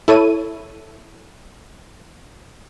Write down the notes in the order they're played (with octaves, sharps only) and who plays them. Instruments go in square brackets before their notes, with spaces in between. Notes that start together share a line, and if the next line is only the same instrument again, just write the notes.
[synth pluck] E4 A4 C#5 D#7